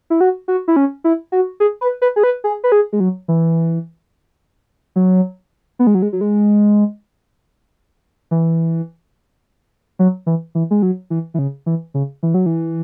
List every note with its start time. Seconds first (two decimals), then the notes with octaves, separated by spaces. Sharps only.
0.10 E4
0.21 F#4
0.48 F#4
0.68 E4
0.76 C#4
1.04 E4
1.32 F#4
1.60 G#4
1.81 B4
2.02 B4
2.16 G#4
2.23 B4
2.44 G#4
2.64 B4
2.72 G#4
2.93 G#3
3.00 F#3
3.28 E3
4.96 F#3
5.79 B3
5.87 G#3
5.95 F#3
6.02 G#3
6.13 F#3
6.21 G#3
8.31 E3
9.99 F#3
10.26 E3
10.55 E3
10.71 G#3
10.82 F#3
11.10 E3
11.34 E3
11.39 C#3
11.66 E3
11.94 C#3
12.23 E3
12.34 F#3
12.46 E3